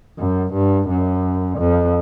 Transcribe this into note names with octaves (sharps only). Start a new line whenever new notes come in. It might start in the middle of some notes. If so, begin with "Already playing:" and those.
F#2
G2
F#2
F2